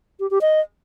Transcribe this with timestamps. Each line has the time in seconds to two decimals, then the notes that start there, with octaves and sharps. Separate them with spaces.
0.20 G4
0.31 G4
0.41 D#5